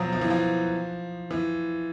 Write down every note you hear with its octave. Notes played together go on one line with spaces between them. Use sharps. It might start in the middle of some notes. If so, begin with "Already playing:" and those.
Already playing: B2 F3 F#3
F3
E3
F3
E3